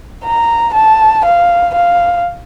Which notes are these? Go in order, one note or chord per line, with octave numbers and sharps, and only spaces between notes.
A#5
A5
F5
F5